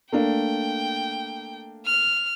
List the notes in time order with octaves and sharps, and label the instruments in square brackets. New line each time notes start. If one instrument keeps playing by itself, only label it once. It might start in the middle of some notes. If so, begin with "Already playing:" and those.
[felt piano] A3 A#3 D4 [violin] G5
[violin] F6